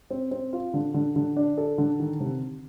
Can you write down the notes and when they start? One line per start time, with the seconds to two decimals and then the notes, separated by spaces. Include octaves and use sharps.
0.10 C4
0.31 C4
0.53 F4
0.74 D3
0.94 D3
1.16 D3
1.36 D4
1.58 A4
1.78 D3
2.00 D#3
2.20 C3